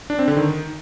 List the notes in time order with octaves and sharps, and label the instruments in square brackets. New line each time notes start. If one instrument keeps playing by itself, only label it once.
[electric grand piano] D4
C4
D3
D#3